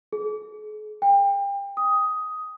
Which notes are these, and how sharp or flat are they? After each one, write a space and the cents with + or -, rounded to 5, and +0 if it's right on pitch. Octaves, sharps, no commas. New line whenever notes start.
G#4 +45
G5 +30
D#6 +10